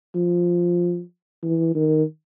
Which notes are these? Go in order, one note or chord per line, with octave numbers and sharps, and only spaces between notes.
F3
E3
D#3